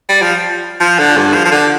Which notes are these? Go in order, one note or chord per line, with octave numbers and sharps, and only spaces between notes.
G3
F3
F3
D3
G2
F3
F3
D3